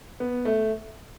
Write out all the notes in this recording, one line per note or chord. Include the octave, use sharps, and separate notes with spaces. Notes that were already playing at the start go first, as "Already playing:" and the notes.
B3
A3